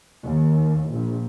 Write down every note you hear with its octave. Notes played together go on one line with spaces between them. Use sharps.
D#2
A#1